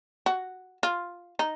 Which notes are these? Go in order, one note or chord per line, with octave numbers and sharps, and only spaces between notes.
F#4
F4
D#4